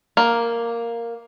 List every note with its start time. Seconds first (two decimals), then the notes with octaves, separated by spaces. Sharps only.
0.17 A#3